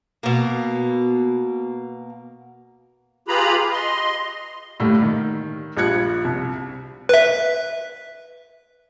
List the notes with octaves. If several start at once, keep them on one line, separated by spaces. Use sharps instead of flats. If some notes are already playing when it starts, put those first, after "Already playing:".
B2 A#3
F4 G4 G#4 B4 A#5 B5
D#5 C6
A2 D3 G3 A3 A#3
D#3
A#1 F3 G3 F#6 G#6 C#7
C2
B4 E5